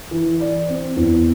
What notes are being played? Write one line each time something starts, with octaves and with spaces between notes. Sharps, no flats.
E3
D5
C4
E2